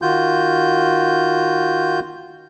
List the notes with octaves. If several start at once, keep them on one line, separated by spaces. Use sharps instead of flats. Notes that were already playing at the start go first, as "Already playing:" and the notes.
D#3 F4 F#4 G6